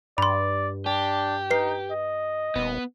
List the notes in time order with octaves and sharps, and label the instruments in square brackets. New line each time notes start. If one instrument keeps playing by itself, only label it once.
[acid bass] G2 [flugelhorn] D5 [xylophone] B5 C6
[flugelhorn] D4 [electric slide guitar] G4
[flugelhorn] D#4 [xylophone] B4 C7
[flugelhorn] D#5
[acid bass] D#1 [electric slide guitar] B3